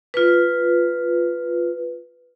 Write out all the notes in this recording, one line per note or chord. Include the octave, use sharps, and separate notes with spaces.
F4 B4